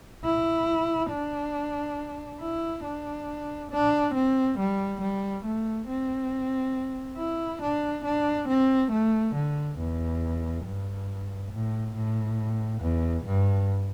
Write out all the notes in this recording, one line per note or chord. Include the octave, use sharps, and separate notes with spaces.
E4
D4
E4
D4
D4
C4
G3
G3
A3
C4
E4
D4
D4
C4
A3
D3
E2
G2
A2
A2
E2
G2